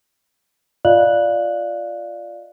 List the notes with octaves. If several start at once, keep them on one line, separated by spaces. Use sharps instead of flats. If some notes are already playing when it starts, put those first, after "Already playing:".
F4 D5 D#5 F5 F#6 F#7